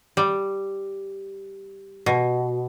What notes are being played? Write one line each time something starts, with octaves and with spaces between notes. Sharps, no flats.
G3
B2